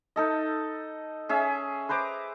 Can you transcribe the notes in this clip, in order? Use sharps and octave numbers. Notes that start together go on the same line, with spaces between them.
D#4 A4 D#5
C#4 G#4 E5
B4 C5 A#5 D6